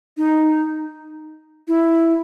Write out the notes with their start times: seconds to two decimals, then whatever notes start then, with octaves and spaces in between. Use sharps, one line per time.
0.17 D#4
1.68 E4